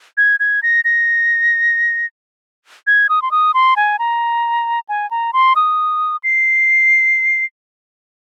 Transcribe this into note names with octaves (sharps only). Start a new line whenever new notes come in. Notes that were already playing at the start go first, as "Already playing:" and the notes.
G#6
G#6
A#6
A#6
G#6
D#6
C6
D#6
C6
G#5
A#5
G#5
A#5
C6
D#6
C7